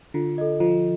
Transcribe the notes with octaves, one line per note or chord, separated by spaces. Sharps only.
D3 F4
A4 D#5
F3 F4